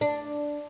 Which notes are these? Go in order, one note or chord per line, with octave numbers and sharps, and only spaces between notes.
D4